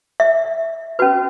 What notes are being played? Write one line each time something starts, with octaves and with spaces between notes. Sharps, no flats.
E5
C#4 F#4 B4